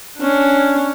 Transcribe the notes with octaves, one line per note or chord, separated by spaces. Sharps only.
C#4 D4